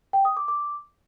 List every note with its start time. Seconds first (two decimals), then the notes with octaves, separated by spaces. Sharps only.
0.13 G5
0.25 D#6
0.37 D6
0.48 D6